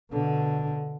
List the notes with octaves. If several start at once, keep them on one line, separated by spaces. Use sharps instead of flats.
B2 D3